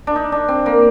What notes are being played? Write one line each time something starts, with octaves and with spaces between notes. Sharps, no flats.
D4
D#4
D4
C4
A#3